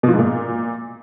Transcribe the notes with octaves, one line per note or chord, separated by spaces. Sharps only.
B2
F3
G#2
A#2